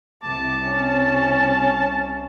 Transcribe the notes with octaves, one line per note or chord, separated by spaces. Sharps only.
C2 C3 A5 D6
C#4